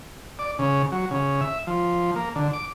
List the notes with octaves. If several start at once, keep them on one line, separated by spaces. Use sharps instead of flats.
D5
C#3
F#3
C#3
E5
F3
A#3
D3
D6